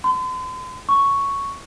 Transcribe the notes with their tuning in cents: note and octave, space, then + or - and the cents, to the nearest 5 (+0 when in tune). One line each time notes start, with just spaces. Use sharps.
C6 -45
C#6 +0